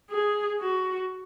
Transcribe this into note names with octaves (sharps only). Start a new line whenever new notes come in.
G#4
F#4